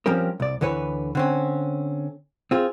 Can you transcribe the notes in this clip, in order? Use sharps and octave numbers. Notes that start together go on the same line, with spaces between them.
F3 G3 C4 C#4 A#4
C2 D5
D2 D3 E3 B4 C#5
D3 C4 C#4
C4 F4 G#4